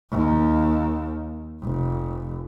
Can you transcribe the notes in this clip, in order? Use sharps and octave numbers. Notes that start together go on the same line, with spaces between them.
D#2
F1